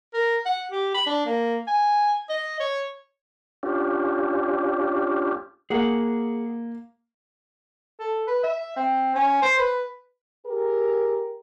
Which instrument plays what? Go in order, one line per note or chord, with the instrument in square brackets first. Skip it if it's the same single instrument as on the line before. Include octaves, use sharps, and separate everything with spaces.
[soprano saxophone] A#4
F#5
G4
B5
D4
A#3
G#5
D#5
C#5
[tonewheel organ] C#4 D4 F4 G4
[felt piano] A#3 [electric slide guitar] G#4 F#5
[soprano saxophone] A4
B4
E5
C4
C#4
C5
B4
[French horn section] G4 G#4 A#4